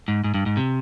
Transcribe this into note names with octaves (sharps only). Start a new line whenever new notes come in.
G#2
G#2
G2
G#2
C3